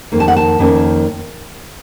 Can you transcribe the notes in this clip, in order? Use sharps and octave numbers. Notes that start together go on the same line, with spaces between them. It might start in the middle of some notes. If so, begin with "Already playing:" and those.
F2 D#3 A#3
A5
F#5
A5
F2 D#3 A#3 C#4